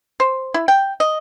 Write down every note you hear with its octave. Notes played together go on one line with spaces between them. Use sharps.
C5
E4
G5
D#5